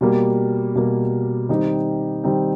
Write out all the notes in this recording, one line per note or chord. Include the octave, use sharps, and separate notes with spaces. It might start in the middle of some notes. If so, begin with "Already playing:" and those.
B2 G3 A#3
B2 G3 A#3
D#3 G3 C4 D#4
D#3 G3 C4 D#4